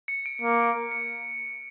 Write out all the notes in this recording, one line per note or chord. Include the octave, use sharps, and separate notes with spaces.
C#7
D7
A#3
C#7